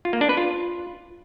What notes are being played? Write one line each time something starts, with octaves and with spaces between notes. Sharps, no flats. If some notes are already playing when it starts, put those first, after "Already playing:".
F4
A#3
D4
B4
F4